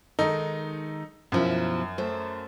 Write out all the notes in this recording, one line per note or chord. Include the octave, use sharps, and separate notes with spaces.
D#3 G#3 D#4 A4
F#2 B2 F3 E4
A3 C5